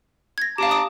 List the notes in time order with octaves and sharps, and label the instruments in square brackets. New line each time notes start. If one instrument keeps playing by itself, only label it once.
[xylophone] G#6 A#6
[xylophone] G4 F5 [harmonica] A5 A#5 D6
[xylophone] D#6 D7